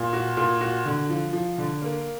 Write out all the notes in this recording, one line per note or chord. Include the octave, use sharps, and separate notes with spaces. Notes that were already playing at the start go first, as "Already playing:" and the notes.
Already playing: A#2
F#4
A#2
F#4
D3
F3
F3
D3
A#3